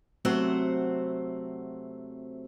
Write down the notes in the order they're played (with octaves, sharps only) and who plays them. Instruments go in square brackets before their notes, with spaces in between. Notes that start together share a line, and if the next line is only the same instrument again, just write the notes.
[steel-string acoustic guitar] C3 F#3 A3 C4 C5 F#5